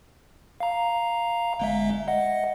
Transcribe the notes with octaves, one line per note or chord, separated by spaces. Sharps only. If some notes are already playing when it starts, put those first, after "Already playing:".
F5 A#5
G1 G#3 E5
D#5 F#5